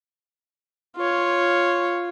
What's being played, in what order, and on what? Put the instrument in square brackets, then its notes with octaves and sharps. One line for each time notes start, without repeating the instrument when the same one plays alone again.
[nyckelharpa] F4 C#5